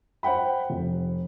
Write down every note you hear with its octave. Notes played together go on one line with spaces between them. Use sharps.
C5 F#5 G5 B5
F1